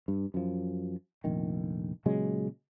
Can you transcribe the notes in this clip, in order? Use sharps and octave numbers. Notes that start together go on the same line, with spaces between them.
G2
F#2 F3
F1 A#1 D#3
A#2 C#3 F#3 G#3